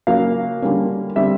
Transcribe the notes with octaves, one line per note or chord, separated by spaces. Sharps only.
C#3 F#3 A#3 C#4 F5
D3 G3 A#3 C#4
D3 G3 C4 E5